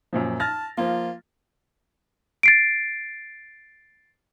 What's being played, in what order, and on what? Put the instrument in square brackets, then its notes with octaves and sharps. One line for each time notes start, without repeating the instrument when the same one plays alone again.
[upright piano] F#2 A#2 F3
[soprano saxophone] A5 [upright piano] F6 A6 A#6
[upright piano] F3 A#3 [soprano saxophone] F4
[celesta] A6 C7 D7